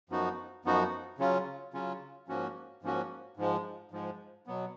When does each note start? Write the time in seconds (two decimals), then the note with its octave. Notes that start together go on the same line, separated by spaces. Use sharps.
0.10 F#2 F3 B3 D#4 F#4
0.65 F#2 F3 B3 D#4 F#4
1.19 C#3 F#3 C#4 F4
1.74 C#3 F#3 C#4 F4
2.28 G#2 F3 A#3 C#4 F#4
2.82 G#2 F3 A#3 C#4 F#4
3.37 G#2 F3 G#3
3.91 G#2 F3 G#3
4.46 B2 F#3 B3